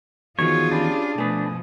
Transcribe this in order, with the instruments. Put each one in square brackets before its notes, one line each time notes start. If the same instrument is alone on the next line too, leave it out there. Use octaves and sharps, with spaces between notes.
[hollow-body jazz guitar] E2 D#3 F3 [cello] F4 G#4 [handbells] F#4 [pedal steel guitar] C#5
[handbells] C#4 G4 B5 [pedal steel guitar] D4
[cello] B2 F3 [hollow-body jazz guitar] A3 B4 [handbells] G#5 D#6